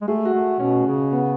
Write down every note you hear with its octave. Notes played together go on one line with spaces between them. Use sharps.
G#3
A3 G#4
F#4
A3
B2 C#4
C#3
B3